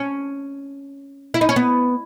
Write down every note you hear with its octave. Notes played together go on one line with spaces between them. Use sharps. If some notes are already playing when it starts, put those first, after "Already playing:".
Already playing: C#4
E4
D#4
C#4
B3